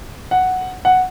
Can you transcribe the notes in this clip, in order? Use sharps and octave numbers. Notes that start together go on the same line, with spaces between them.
F#5
F#5